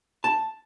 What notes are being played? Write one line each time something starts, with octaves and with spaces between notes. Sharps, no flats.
A5